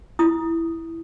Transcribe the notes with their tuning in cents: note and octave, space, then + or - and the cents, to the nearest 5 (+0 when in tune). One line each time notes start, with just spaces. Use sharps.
E4 +0 D#6 +0